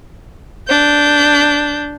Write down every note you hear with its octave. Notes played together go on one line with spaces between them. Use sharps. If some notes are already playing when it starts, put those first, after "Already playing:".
D4 G6